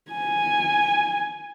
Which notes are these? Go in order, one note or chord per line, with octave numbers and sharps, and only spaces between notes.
G#5